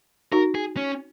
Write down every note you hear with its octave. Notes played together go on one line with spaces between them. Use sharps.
D#4 F#4 A#4
G#4
C#4